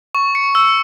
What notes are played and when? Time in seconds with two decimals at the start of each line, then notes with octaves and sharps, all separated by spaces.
0.15 C#6
0.35 C#7
0.55 E6